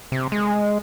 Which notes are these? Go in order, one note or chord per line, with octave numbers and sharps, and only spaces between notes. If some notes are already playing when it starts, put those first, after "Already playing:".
C3
G#3